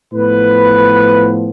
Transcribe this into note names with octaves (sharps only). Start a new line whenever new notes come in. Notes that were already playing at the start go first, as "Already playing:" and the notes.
A2 F3 B3 B4